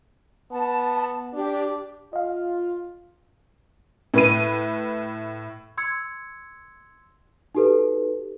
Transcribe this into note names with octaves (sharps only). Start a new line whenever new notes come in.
B3 A5
D4 G4
F4 D#5 F5
A2 B4 D#7
C6 E6 G#6 C#7
D#4 F#4 G4 A4 B4